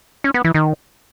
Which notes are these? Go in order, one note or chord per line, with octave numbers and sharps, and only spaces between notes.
C#4
B3
E3
D#3